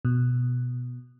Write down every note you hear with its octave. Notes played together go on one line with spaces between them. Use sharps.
B2